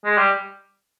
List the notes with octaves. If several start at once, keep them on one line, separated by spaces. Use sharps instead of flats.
G#3
G3